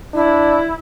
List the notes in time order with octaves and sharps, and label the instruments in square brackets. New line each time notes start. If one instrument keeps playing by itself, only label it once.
[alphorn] D4 [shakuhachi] E4